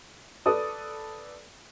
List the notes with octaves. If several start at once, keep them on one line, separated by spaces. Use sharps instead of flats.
A4 B4 D5 D#6